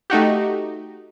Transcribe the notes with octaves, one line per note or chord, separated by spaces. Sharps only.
A3 D#4 F#4 G4